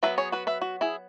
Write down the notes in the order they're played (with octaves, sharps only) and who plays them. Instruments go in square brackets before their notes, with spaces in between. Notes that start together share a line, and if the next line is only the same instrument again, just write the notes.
[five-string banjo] F#3 B3 B4 E5
G#4 C#5
F#4 B4
B4 E5
F#4
E4 G#4